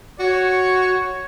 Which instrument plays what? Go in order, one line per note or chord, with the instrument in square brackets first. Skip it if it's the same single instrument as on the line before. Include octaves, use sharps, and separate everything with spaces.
[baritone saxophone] F#4 [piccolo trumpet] C#5